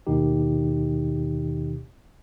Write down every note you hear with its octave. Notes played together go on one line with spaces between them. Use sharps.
D#2 B2 D#3 D#4 G4